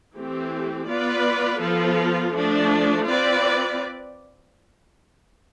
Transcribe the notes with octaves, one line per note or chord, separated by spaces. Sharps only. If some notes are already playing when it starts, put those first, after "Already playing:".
E3 A3 C4 G4
B3 F4 B4 D5
F3 B3 F4 A4
F3 A3 D4
C4 F4 B4 D5